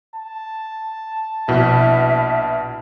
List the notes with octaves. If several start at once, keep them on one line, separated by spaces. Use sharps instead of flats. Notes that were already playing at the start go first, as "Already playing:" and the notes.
A5
A#1 B2 E4 E5